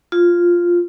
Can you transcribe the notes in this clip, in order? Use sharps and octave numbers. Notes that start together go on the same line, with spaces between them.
F4